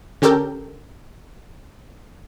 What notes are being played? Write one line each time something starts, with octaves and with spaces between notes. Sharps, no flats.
D3 C#4 G4 A4 A#4 G6